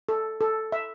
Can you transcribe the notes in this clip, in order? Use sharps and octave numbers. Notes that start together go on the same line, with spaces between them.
A4
A4
E5